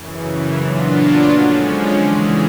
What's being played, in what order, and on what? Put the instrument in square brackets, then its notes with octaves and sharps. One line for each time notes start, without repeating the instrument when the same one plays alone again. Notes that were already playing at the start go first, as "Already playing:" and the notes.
Already playing: [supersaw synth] F#2 C#3 E3
A#2 F#3 B3 D4 F4
D3 F3 G#3 C#4
C#3 E3 G#3